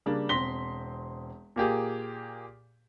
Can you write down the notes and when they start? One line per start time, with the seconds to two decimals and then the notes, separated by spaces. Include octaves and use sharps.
0.06 C#3 G3 A#3 D4
0.29 E1 C4 C6 A#6 B6 G7
1.56 A#2 A#3 G4 G#4